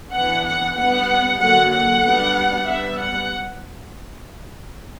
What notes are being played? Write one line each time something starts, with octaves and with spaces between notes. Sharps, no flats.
E3 B3 D4 F#5
F#5
G3 B3 D4 F#5
D3 F#3 A#3 F#5
F#5
G3 B3 D4
G3 B3 D4 E5
F#5